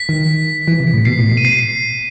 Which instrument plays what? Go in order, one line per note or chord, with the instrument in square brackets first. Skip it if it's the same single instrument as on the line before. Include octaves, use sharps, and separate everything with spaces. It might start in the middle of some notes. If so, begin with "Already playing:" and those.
Already playing: [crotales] B6
[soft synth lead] D#3
E3
C3
A2
[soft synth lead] B2 [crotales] C7
[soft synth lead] A2
B2
[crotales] D#7
C7